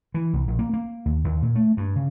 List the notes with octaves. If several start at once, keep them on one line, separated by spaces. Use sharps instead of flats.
E3
C2
A#1
A#3
A#3
D#2
D#2
A#2
A3
G2
C#3